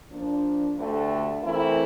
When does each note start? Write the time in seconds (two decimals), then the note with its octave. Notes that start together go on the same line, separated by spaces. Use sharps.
0.11 F3 A#3 D4
0.77 D2 D3 A3 D4 G4
1.43 E3 A3 C4 E4 A#4